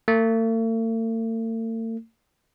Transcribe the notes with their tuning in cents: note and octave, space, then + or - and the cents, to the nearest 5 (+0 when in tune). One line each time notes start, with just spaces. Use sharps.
A3 +45